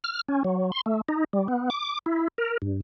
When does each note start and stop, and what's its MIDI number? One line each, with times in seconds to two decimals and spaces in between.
0.04 0.21 89
0.28 0.43 61
0.44 0.71 54
0.72 0.81 84
0.86 1.01 57
1.08 1.24 63
1.33 1.47 55
1.48 1.70 59
1.70 1.99 86
2.06 2.28 64
2.38 2.57 70
2.62 2.81 43